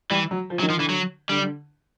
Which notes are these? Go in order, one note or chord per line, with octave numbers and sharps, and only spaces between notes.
E3 G3
F#3
F3
F#3
D#3
F3
D3 E3
F#3
D3 G3
D3